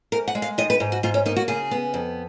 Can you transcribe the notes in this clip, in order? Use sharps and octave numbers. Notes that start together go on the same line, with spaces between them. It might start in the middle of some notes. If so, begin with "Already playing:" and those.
G#2 A#4
F#5
G#3
F5
D#3 D#5
B4
G#2
F#4
G#2 F4
C#4
A#3 D#4
F#4
C#3 G#4
B3
F2